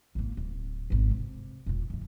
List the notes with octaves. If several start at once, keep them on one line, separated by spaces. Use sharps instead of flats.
G#1 A#3
D1
G#1 E2
C3
E1 A#1
F#2 D#3